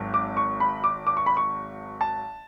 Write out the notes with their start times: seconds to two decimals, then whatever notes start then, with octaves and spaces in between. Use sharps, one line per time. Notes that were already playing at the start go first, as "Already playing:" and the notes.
Already playing: G#1 G#2 F#3
0.14 D6
0.37 C#6
0.60 B5
0.84 D6
1.07 D6
1.17 C#6
1.26 B5
1.37 C#6
2.01 A5